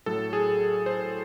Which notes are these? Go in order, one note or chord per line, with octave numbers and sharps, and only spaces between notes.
A2 F#3 A4
G#4
C5